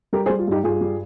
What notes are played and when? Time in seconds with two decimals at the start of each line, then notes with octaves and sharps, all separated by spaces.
0.13 G3 G4 A#4
0.26 G#4 C5
0.30 G3
0.39 F4
0.48 G2 D#4 G4
0.64 G2 F4 G#4
0.81 G3